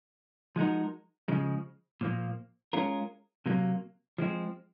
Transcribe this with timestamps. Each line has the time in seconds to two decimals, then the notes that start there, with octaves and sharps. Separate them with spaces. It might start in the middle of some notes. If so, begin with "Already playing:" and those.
0.56 F3 G#3 D#4 F#4 A#4
1.28 C#3 F3 G#3
2.01 A#2 F3 A#3
2.73 G#3 C#4 F4 A#4
3.46 C3 F#3 A#3
4.18 F3 G#3 C4